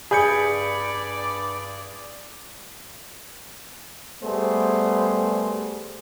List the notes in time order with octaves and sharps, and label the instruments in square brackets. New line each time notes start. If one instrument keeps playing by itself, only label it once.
[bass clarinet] G2 [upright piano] G#4 [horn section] D5 [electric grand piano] B5 G6 C#7
[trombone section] G3 A3 B3 G#4 C5